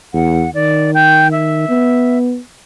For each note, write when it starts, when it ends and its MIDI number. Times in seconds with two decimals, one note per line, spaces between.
0.14 0.46 40
0.14 0.50 78
0.54 1.69 51
0.54 0.91 74
0.94 1.31 79
1.31 2.18 76
1.69 2.39 59